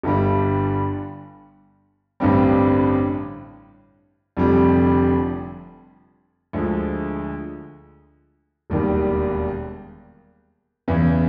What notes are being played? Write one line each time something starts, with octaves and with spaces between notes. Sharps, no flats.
G1 G2 D3 G3
A1 G2 D3 G3 C4
F1 F2 D3 G3
D2 D3 F3 G#3
E1 D#2 D#3 G3
E2 C#3 E3